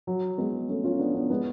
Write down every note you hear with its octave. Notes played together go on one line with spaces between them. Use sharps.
F#3
G#3 B3
A3 C#4
C#4 F4
B3 D4
B3 D4
G#3 B3